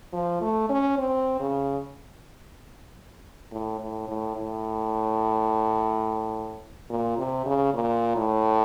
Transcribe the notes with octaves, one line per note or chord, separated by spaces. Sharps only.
F3
A3
C#4
C4
C#3
A2
A2
A2
A2
A#2
C3
C#3
A#2
A2